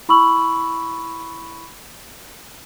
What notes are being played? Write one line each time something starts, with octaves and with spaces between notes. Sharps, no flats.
E4 B5 C#6 E6 F#7